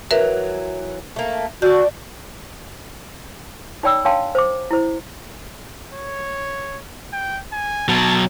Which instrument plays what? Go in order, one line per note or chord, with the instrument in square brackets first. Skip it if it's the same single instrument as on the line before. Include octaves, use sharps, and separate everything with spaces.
[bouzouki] E3 F#3 [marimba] A#4 B4 E5
[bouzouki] A3 A#3
[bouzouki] D4 D5 [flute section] F#4 [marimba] G6
[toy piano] D#4 C#5 D5 G5 B5 E6
D4 C#5 F5 G5 A5 C6
C5 D6
E4 C5
[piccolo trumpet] C#5
G5
G#5
[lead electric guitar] B2 F#3 [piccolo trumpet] A5